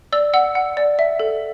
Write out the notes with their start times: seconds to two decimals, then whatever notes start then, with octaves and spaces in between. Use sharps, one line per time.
0.12 D5 E6
0.34 F#5 E6
0.55 F#5
0.77 D5
0.99 E5
1.20 A4